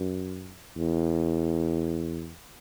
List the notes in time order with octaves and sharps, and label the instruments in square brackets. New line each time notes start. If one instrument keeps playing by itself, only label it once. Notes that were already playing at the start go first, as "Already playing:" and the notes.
Already playing: [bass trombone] F#2
E2